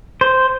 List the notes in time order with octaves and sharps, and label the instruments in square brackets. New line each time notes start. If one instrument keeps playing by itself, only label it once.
[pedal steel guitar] C5